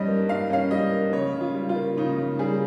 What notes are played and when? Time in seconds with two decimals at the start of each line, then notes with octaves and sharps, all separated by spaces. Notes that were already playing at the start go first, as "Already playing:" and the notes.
Already playing: G2 G3 C#4 D#5
0.08 A#3
0.29 G2 F5
0.50 C#4 F5
0.71 G3 D#5
0.92 A#3
1.13 C#3 C#5
1.34 C#3
1.41 F4
1.54 G3
1.69 F4
1.76 A#3
1.97 C#3 D#4
2.18 C#3
2.39 G3 G#4